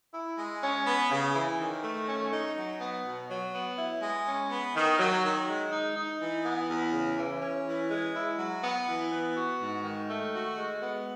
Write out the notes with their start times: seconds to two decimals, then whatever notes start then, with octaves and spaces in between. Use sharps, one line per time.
0.14 E4
0.38 G#3
0.62 C#4
0.86 B3
1.11 C#3
1.35 E3
1.59 D#3
1.84 A3
2.07 C#4
2.32 D#4
2.57 F#3
2.80 B3
3.05 B2
3.29 F#3
3.53 B3
3.78 E4
4.02 G#3
4.26 C#4
4.50 B3
4.75 D#3
4.99 F#3
5.23 D#3
5.48 G#3
5.71 D#4
5.96 D#4
6.20 E3
6.44 B3
6.68 E2
6.93 C#3
7.17 E3
7.42 C#4
7.66 E3
7.90 G#3
8.14 E4
8.38 F#3
8.63 B3
8.87 E3
9.12 B3
9.35 F#4
9.60 G#2
9.84 D#3
10.08 A3
10.33 F#4
10.56 G#3
10.81 B3